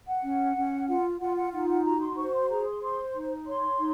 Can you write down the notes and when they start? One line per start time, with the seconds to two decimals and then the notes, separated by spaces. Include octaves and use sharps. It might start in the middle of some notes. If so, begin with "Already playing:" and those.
0.08 F#5
0.24 C#4
0.56 C#4
0.88 F4 F#5
1.20 F4 F#5
1.37 F#5
1.52 D#4 F#5
1.69 F#5
1.85 F#4 A#5
2.01 C6
2.17 C5 C#6
2.33 C6
2.49 G#4 A#5
2.66 C6
2.81 C5 C6
3.14 D#4
3.46 C#5 C6
3.78 D#4